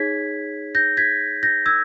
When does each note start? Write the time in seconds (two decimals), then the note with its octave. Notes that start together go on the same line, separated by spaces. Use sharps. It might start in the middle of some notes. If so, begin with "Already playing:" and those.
Already playing: D#4 G#4 C#5 G#6 B6
0.75 G6 A#6
0.97 G#6 B6
1.43 G6 A#6
1.66 E6 G#6